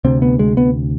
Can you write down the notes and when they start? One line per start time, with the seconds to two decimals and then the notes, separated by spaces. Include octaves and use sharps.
0.04 D2 C3 C4
0.22 B3
0.39 G#3
0.57 B3